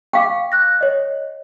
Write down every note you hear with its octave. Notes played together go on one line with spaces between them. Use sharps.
F5 G5 C#6 D6
F#6 A#6
C#5 D#5